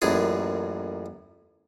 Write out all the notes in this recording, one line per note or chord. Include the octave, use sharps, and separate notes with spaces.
A1 F#2 A#2 G#4